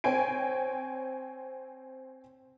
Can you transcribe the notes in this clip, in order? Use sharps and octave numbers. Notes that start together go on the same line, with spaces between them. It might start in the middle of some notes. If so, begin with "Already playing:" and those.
C4 C#5 G5 G#5 D7